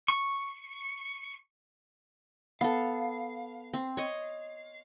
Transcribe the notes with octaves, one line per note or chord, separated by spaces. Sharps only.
C#6
B3 A4 F5
C4
C#5 D#5